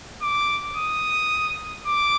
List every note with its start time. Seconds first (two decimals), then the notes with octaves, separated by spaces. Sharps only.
0.22 D6
0.76 D#6
1.87 D6